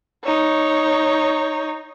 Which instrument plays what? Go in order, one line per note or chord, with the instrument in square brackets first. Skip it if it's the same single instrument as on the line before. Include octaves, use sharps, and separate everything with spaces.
[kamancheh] D#4 C#5